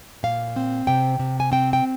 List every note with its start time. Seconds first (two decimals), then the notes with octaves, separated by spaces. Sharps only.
0.23 A#2 F5
0.56 C4
0.87 C3 G5
1.20 C3
1.40 G#5
1.52 C4 G5
1.73 G5